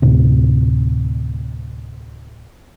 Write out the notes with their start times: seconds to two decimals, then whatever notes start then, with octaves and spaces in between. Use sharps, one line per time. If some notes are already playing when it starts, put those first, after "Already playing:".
0.02 D2 A2 C3